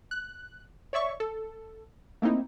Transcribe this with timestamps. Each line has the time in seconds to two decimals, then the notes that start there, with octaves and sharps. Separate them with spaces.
0.11 F#6
0.93 C#5 D5 E5 C#6
1.20 A4
2.22 A3 A#3 C4 D#4 E4